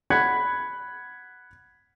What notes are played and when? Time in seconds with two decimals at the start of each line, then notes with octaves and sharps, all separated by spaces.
0.10 F#5 B5 F#6 G#6 B6 C#7